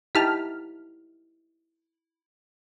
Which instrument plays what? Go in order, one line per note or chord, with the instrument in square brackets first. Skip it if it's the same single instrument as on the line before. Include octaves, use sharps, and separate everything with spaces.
[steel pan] D#4 E4 G4 [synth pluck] A5 F6 B6